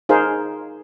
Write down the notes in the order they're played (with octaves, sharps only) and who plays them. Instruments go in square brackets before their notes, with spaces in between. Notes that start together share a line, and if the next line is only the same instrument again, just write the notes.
[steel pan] D#4 G#4 A#4 C5 F5